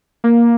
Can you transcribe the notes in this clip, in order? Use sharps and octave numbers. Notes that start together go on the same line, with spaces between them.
A#3